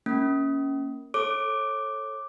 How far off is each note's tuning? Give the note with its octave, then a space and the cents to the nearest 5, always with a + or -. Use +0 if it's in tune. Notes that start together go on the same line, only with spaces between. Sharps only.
A#3 +0 C#4 +0
A4 +0 C#5 -25 D6 +0